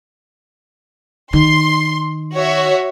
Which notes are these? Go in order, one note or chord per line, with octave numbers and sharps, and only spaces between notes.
D#3 C6
F#4 C#5 E5